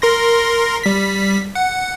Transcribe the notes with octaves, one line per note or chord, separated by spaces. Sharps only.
A#4 C6 A#6
G3 B6
F#5